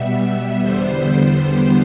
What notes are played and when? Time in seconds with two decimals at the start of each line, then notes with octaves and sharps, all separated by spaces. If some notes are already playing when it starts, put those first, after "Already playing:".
Already playing: B2 G3 B3 E5
0.61 E2 D3 G3 B3 C5